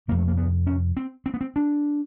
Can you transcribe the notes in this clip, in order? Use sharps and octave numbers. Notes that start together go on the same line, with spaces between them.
F2 C3 A#3
A3
A#3
B3
C#4
C4
C4
B3
C4
D4